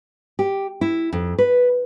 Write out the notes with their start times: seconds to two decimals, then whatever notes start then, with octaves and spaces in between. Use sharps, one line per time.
0.39 G4
0.81 E4
1.13 F2
1.38 B4